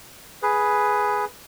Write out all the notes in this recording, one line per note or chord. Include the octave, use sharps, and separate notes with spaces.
G#4 B4